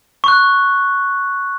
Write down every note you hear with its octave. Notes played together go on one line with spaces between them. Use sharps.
C#6 F#6